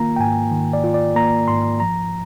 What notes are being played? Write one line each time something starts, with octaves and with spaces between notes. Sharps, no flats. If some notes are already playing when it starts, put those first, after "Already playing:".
Already playing: D#3 A#3 F4 A#5
G5
G#2 G#5
D#3
D5
F4
D5
A#3 A#5
G#2 C6
F3 A#5